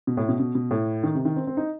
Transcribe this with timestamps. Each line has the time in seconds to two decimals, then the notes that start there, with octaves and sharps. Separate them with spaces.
0.07 B2
0.17 A2
0.29 B2
0.40 B2
0.55 B2
0.71 A2
1.03 D#3
1.15 C3
1.25 D#3
1.36 C4
1.47 C4
1.57 D#4